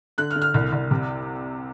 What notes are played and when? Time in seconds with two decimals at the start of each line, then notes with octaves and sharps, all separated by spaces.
0.18 D3 F#6
0.30 F6
0.35 D3
0.42 F6
0.54 C2
0.72 C2
0.91 C3